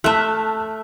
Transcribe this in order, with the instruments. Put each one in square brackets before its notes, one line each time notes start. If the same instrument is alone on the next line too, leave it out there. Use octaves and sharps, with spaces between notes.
[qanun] A3 E5 [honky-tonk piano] A5 F6 F#6